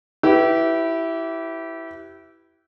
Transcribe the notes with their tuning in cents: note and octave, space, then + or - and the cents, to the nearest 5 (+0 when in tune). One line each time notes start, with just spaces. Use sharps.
E4 +0 G4 -25 B4 +0